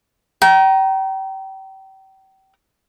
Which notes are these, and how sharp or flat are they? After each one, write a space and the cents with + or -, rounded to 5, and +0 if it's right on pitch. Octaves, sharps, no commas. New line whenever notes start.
G5 -35 A#5 +20